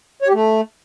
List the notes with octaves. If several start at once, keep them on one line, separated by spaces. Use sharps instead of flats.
C#5
G4
A3